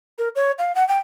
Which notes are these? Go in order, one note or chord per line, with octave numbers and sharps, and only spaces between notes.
A#4
C#5
F5
F#5
G5